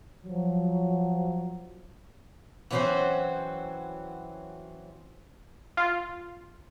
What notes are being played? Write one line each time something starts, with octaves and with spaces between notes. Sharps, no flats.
F3 F#3
E3 F#3 C4 C#4 F#4 C5
F4